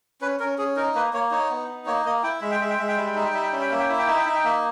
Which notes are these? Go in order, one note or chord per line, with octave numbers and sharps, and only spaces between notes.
C#4 B4
C#4 A#4
C#4 G#4
D#4 A#4
A#3 B4
A#3 C#5
D#4 C#5
B3
D#4
A#3 C#5
A#3 D#5
E4 G5
G#3 E5
G5
G#3 E5
G5
G#3 E5
G5
G3 E5
G5
D#4 E5
G5
G3 E5
G5
C#4 E5
G5
A#3 E5
G5
E4 E5
G5
D#4 E5
G5
D#4 E5
G5
A#3 E5